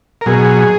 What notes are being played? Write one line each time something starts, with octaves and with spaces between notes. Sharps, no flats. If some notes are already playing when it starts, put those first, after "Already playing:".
A#4
B2 F#3 G#4